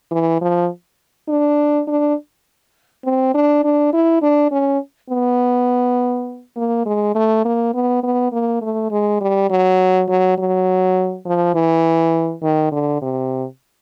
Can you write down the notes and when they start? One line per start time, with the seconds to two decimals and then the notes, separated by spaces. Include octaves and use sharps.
0.11 E3
0.41 F3
1.29 D4
1.87 D4
3.05 C4
3.34 D4
3.64 D4
3.93 E4
4.22 D4
4.52 C#4
5.10 B3
6.56 A#3
6.86 G#3
7.15 A3
7.45 A#3
7.74 B3
8.03 B3
8.32 A#3
8.62 A3
8.91 G#3
9.21 G3
9.50 F#3
10.08 F#3
10.38 F#3
11.26 F3
11.54 E3
12.43 D#3
12.72 D3
13.02 C3